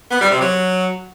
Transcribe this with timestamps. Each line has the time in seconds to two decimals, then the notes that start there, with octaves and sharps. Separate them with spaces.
0.11 B3
0.21 G3
0.31 C3
0.41 F#3